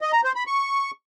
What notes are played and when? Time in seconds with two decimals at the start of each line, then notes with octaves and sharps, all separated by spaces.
0.01 D#5
0.13 A#5
0.24 C5
0.36 B5
0.47 C#6